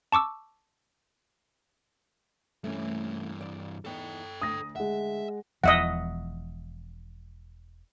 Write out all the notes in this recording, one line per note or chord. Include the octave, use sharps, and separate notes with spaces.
A5 C#6 D6 E6
G2 E3 A3 C#4
D5
E2 B3 D#4 A4 G5
D2 D4 D#6 A#6
G#3 E5 F#5
E1 E2 F3 D#5 E5 F#5